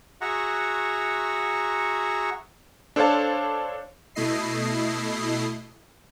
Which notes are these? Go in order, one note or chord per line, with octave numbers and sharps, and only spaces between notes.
F#4 G#4 E5 F#5 A#5 C#6
D4 A4 C5 C#5 F5 A5
B2 A3 E4 D#5 C7